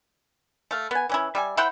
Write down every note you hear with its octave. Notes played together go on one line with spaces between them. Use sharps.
A3 F5
B3 G#5
E3 C#4 E4
G3 E5 G#5
E4 C5 F#5 G5